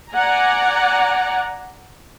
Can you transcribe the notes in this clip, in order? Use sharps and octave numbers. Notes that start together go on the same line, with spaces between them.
D5 F#5 G#5 A#5